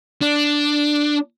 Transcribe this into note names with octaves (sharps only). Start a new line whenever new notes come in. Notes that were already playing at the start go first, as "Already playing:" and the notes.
D4